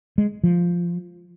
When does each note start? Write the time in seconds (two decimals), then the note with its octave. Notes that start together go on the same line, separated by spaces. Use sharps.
0.18 G#3
0.44 F3